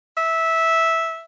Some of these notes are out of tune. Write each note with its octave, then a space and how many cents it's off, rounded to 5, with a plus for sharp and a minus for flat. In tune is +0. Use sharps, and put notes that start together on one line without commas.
E5 -10